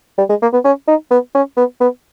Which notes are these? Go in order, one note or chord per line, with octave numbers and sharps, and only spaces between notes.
G3
G#3
A#3
B3
C#4
D#4
B3
C#4
B3
B3